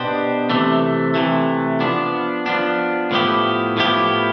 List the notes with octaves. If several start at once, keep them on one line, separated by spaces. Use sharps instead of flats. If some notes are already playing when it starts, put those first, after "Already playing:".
Already playing: B2 B3 D4 G4 C5
C3 E3 A3
C3 E3 A3
F3 B3 D4
F3 B3 D4
A2 F3 B3 E4 G4
A2 F3 B3 E4 G4